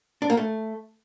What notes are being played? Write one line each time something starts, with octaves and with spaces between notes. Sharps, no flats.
D4
A#3
A3